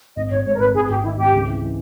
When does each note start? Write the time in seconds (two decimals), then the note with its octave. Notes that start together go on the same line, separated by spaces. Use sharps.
0.16 G#1 D#5
0.31 G#1 C#5
0.45 G#2 C#5
0.55 A#4
0.60 G#1 B4
0.74 G#1 G#4
0.89 G#1 G4
1.03 D#3 E4
1.17 G#1 G4
1.33 C#2
1.47 E3
1.62 E3